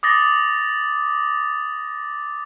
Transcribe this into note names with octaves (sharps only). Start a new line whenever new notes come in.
D6 D#6 A6 A#6